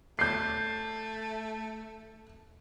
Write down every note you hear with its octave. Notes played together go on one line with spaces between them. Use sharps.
A3 G6 C7